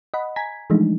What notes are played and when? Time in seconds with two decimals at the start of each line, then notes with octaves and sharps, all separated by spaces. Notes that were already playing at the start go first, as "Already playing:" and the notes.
0.14 D#5 F#5 B5
0.36 G#5 A#5 G#6 B6
0.70 E3 F3 G#3 A3 D4 D#4